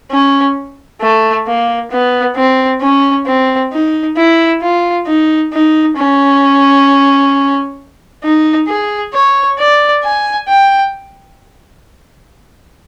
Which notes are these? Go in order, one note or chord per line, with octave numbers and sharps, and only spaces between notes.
C#4
A3
A#3
B3
C4
C#4
C4
D#4
E4
F4
D#4
D#4
C#4
D#4
G#4
C#5
D5
G#5
G5